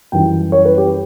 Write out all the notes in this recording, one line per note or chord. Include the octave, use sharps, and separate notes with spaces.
F#2 E3 G3 G5
C#5
B4
G4